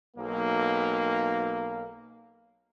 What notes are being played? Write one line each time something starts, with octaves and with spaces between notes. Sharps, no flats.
B1 A#3